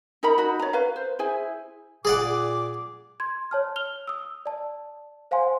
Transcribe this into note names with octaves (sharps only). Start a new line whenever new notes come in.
D#4 A#4 A#5 B5
D#4 F#4 B5
C#5 A#5
B4 F5
C5
E4 G#4 C5 G#5
A#2 G#4 D5 F#5 D6
C6 G#6
C#5 A5 F6
F6 F7 G7
D#6 E6
D5 A5
C5 F5 F#5 G#5 C6